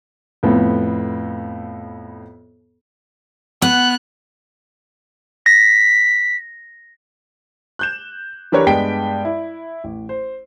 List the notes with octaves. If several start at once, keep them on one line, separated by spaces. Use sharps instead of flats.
F2 A2 B3
B3 F#6
A#6 B6
F#6 G6 E7
E3 D4 G4 A#4 B4 C#5
G2 G#3 B3 G5 B6 D7
E4
A1
C5